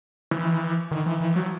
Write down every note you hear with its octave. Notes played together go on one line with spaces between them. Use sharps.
E3
D#3
E3
E3
F#3